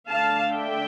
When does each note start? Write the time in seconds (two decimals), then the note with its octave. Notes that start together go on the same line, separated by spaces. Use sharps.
0.10 D3 A3 D4 F5 A5
0.53 E5 G5